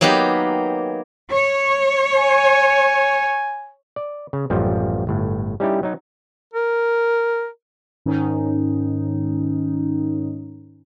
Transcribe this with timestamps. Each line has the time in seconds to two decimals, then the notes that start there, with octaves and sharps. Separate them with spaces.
0.01 F#3 A#3 B3 D#4 G4
1.33 C#5
2.17 G#5
3.96 D5
4.33 C#3
4.50 A1 F#2 F3 G3 F4
5.07 G1 A2
5.60 G3 C#4 D#4 E4 G4
5.83 F#3 D#4
6.54 A#4
8.06 G#2 D#3 C#4 D#4